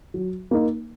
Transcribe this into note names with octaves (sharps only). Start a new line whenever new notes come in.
F#3
A#3 D#4